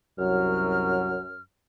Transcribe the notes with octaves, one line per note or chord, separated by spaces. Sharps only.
C2 F#2 F#3 F6